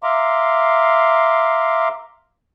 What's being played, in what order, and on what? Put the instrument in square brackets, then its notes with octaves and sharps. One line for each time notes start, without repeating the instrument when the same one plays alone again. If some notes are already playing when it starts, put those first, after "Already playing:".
[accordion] E5 F5 A#5 C6 D6